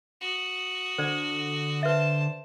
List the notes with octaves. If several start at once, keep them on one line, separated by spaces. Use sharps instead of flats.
F#4 D#6
D3 C5 D5
B4 C5 E5 A5